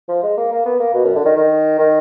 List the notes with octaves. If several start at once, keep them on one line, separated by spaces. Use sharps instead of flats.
F3
G#3
A#3
A#3
B3
A#3
B2
F#2
D3
D#3
D#3
D#3